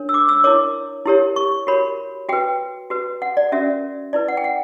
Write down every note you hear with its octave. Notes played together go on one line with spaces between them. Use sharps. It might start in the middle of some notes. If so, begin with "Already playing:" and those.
Already playing: D4 A#4 C#5
E6
D6
E6
E4 A#4 C#5 D6
E4 G4 A#4 C#5
C#6
F#4 A#4 C#5 B5
F#4 B4 G5
F#4 B4
F#5
D5
C#4 F#4 A#4 E5
E4 B4 D5
F#5
G5
F#5